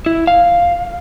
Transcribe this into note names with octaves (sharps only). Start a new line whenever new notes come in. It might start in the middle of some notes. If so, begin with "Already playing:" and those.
E4
F5